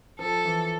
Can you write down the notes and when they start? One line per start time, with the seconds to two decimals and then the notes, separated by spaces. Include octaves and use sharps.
0.19 F3 A4
0.45 E3